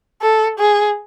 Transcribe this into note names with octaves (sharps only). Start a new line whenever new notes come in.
A4
G#4